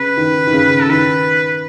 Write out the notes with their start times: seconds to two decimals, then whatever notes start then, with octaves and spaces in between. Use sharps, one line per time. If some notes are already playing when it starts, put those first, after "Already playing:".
Already playing: C#3 B4
0.17 D#3
0.47 D#3
0.53 C#3
0.82 A4
0.89 D#3 B4